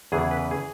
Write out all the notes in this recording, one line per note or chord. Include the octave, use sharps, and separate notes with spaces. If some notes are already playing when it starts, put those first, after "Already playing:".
E2 C#3 E3 G#4
B4
G#4